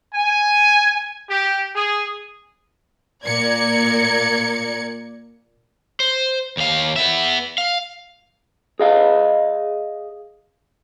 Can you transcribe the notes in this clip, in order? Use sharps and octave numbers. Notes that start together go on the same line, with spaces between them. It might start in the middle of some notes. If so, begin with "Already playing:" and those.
G#5
G4
G#4
A#2 A#4 D5 G#6 C#7
C5
D#2 F5
B3 E5
F5
G#4 D#5 F5